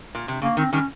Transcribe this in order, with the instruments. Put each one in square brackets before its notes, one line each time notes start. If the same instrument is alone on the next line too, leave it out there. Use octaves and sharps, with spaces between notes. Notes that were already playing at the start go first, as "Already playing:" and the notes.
[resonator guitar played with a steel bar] A#2
C3
[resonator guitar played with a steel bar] C#3 [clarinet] A#3
[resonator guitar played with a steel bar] D#3 [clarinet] C4
[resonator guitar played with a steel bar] D#3 G3 [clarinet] C#4